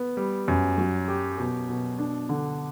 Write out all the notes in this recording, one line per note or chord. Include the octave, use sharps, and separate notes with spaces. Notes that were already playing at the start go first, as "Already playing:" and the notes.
Already playing: B3
G3
F#2
F#3
G4
B2
B2
D4
D3